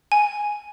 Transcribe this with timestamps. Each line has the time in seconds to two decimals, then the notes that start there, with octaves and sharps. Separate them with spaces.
0.12 G#5